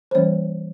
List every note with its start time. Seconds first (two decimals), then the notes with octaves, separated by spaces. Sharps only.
0.11 C5
0.15 E3 G3 A#3 C#4 C#5